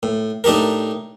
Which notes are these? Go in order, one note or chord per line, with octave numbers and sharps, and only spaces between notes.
A2
A2 D4 D#4 G4 A#4